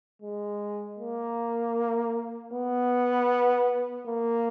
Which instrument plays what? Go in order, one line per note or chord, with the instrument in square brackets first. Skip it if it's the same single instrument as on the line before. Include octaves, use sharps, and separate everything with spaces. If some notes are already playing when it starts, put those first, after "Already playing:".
[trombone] G#3
A#3
B3
A#3